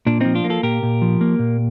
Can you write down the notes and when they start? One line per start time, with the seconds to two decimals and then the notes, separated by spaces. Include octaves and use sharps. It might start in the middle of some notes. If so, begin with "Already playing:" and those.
0.07 A#2 D4
0.20 F3 C4 D#4
0.35 D4 F4
0.44 A#3
0.50 F4 A4
0.63 A#2 G4 A#4
0.83 A#2
1.02 F3
1.21 A#3
1.39 A#2